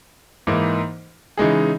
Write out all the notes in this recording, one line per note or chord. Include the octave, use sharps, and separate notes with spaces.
G#2 E3 A#3 D#4
C#3 E3 G#3 D#4 G#4